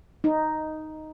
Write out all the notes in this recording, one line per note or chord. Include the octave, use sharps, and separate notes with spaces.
D#4